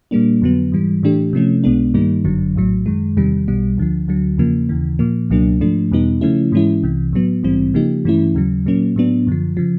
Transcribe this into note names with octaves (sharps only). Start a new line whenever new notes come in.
A#2 G3 A#3 D4
F2 D3 F#3 B3
G#2 E3 G3
A2 E3 A3 D4 G4
C3 F3 A3 C#4
B1 B2 G#3 B3 D4
G2 D#3 G3 A#3 D#4
G1 F#2 D3 F#3
A#1 A2 F#3
F#2 D#3 G#3
E2 C3 D#3 G3
B1 B2 G3
D2 D3 F3
D2 D3 F#3
E2 C#3 F3 A#3
D#2 C#3 E3
A#2 F3 A#3
C#2 B2 F#3 A#3 D4
G#2 F3 A3 D4
E2 B2 G3 B3 D#4
C#3 F3 A3 C#4 E4
G#2 E3 G#3 C#4 E4
C2 C3 E3
A2 F#3 B3
A#1 G#2 E3 G3 C4
C#3 F3 A#3 D#4 G4
G2 E3 A3 C#4 E4
D#2 C#3 F#3
A#2 F#3 A#3 C#4
A2 F#3 B3 D4
F#2 D3 F3
C#3 F3